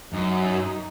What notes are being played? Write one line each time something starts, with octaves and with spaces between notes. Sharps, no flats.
F#2 D#4
D#4